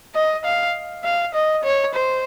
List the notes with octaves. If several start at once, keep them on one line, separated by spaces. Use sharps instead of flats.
D#5
F5
F5
D#5
C#5
C5